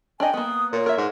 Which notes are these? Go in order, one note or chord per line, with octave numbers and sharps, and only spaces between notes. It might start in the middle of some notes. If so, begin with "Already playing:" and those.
D4 D5 D#5 G5 G#5
A#3 B3 D#6
A#2 C#5
A#4 E5
G#2